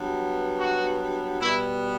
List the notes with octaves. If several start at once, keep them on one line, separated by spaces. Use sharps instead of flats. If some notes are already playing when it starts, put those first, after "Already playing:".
Already playing: G2 F#3 B3
F#4
B2 G3 B3 E4